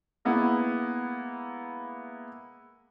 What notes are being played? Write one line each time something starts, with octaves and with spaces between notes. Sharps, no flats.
G#3 A#3 B3 E4